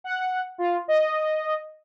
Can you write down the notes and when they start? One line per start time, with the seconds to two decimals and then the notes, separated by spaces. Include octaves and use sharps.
0.04 F#5
0.58 F4
0.88 D#5